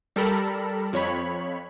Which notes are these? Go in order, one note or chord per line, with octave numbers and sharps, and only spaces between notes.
G3 A4 A#4 B5
F2 C#5 B5